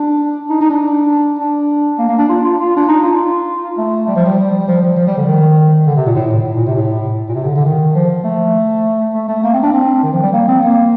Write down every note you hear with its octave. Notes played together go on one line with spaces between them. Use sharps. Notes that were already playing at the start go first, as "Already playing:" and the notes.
Already playing: D4
D#4
D#4
D4
D4
A#3
A#3
D4
F4
F4
F4
D4
D#4
F4
A3
G3
F3
G3
F3
F3
F3
G3
D3
D#3
D3
C3
A#2
A2
A2
A2
A#2
C3
A2
A#2
C3
D3
D3
D#3
F3
A3
A3
A3
A#3
C4
D4
C4
D#3
F3
G3
A#3
C4
A#3